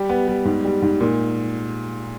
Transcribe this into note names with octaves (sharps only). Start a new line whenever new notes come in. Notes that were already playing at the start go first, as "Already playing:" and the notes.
Already playing: G3 G4
B3
G3
G#2
G3
G#2
A#2